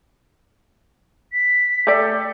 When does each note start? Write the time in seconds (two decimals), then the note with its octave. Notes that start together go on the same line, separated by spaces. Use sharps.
1.33 B6
1.87 A3 G4 A4 D5